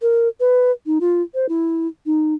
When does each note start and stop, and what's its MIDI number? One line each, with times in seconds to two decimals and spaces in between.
0.02 0.28 70
0.40 0.71 71
0.86 0.98 63
1.00 1.22 65
1.34 1.46 72
1.49 1.87 64
2.06 2.34 63